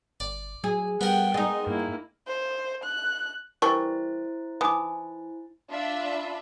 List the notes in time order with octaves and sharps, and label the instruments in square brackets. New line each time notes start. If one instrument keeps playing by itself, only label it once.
[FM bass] G1 [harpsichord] D5
[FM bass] F#3 [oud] G#4
[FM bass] G3 [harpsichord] B3 A#4 [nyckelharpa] F#5 G5
[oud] G#3 D#4 [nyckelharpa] D#5
[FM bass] G2 [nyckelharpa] A#3 E4
[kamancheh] C5
F#6
[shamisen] E3 G3 D4 [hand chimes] E4 C5 A6 [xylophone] A#4 C#6
[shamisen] E3 [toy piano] D#4 G#5 B5 [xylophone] D6 D#6
[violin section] D4 F4 E5 B5